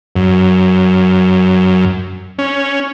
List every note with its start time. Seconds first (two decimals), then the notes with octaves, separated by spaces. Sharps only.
0.16 F#2
2.39 C#4